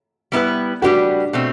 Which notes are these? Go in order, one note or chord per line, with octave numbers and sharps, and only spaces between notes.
G3 B3 E4 B4
G3 D4 F#4 G4 B4
B2 A3 C4